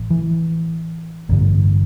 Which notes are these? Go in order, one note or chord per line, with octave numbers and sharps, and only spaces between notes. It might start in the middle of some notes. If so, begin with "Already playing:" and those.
Already playing: A1
E3
A1 G2 D3